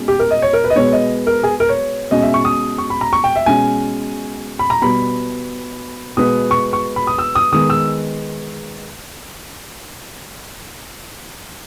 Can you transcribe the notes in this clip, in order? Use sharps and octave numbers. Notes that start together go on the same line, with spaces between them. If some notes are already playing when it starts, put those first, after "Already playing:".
Already playing: B2 G#3 C#4
G4
A#4
D#5
C#5
A#4
B4
D#5
B2 G#3 B3 C#5
D#5
A#4
G#4
A#4
C#5
B2 G#3 C#4 D#5
E5
C#6
D#6
C#6
B5
A#5
C#6
G5
E5
B2 G#3 C#4 G#5
B5
A#5
B2 G3 B3 B5
B2 G#3 B3 D#6
C#6
C#6
B5
D#6
E6
D#6
D#3 G#3 B3 D#6
E6